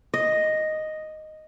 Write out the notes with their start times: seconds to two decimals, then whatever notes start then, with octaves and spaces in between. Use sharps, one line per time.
0.14 D#5